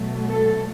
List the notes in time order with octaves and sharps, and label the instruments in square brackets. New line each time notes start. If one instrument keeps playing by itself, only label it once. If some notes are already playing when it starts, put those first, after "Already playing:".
Already playing: [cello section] B2 F#3 A3
A4